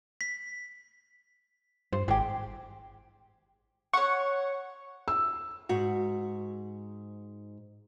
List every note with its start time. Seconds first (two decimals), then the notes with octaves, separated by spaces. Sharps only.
0.21 B6
1.93 G2 C5
2.08 G#1 G4 G#4
3.93 C#5 F#5 C#6
5.08 E6
5.69 G#2 F#4